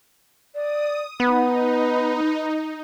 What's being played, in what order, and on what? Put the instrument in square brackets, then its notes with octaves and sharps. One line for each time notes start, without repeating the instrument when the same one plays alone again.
[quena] D5 [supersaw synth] D#6
[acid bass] B3 [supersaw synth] D#4 [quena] B4